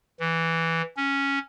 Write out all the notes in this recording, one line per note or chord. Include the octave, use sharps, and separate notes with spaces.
E3
C#4